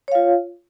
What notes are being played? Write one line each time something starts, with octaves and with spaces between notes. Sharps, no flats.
F4 C#5 F5